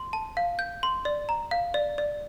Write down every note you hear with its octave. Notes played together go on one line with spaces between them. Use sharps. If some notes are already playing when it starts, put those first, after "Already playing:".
Already playing: C6
A5
F5
G6
C6
D5
A#5
F5
D5
D5